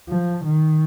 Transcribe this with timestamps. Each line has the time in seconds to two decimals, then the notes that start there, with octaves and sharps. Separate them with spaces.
0.09 F3
0.46 D#3